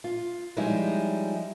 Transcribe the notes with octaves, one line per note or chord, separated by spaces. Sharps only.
F4
F3 G3 G#3 C#4 D#4 E4